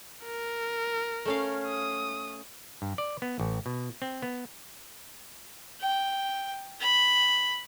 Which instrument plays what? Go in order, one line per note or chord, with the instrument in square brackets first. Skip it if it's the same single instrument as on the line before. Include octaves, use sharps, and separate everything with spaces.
[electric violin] A#4
[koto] A3 C#4 F5
[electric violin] D#6
[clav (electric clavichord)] G2
D5
B3
A1
B2
C4
B3
[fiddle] G5
B5